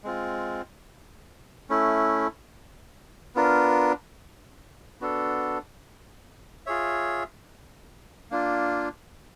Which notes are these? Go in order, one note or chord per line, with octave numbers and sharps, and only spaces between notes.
G#3 C4 F4
A3 C#4 E4
B3 D4 F4 A#4
B3 D4 F#4 A4
F4 G#4 C#5 E5
A#3 D4 F4